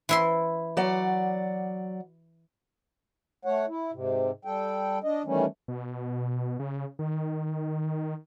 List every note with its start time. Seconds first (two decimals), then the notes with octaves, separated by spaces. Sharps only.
0.09 E3 E4 C6
0.77 F#3 D5 F#5
3.45 A3 C#5 F#5
3.68 E4
3.93 G#2 C3
4.45 G3 A4 G5
5.04 D4 D#5
5.26 D#3 E3 G3 A3 C#4
5.68 B2
6.59 C#3
6.99 D#3